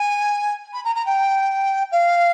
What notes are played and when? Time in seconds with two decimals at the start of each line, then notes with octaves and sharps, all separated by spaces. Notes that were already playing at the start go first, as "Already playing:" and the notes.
Already playing: G#5
0.73 B5
0.84 A#5
0.95 A#5
1.06 G5
1.92 F5